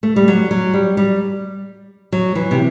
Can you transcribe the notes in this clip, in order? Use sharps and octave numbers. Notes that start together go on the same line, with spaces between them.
A3
G3
F#3
F#3
G3
G3
F#3
E3
C3